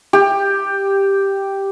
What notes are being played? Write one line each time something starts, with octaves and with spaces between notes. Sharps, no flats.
G4